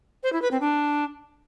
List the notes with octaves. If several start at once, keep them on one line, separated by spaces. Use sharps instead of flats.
C5
E4
B4
C4
D4